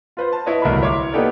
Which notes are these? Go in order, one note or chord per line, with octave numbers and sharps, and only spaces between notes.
F4 B4 C5
A5
E4 B4 C#5 D#5
D1 C2 A#4 B5
E4 C#5 C6 D6
A#3 B3 D#4 G4 A4 D5